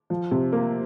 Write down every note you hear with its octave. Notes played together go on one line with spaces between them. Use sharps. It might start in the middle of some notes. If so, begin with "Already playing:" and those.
F3
C3
A#3